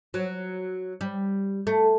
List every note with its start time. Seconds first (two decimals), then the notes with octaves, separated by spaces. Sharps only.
0.14 F#3
1.01 G3
1.67 A3